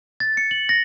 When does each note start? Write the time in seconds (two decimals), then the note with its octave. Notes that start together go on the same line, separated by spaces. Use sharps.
0.20 A6
0.37 C#7
0.51 F#7
0.69 A#6